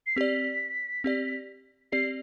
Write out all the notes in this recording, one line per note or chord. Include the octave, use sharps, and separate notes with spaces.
C7
C4 G4 D5 B6
C4 G4 D5
C4 G4 D5 C7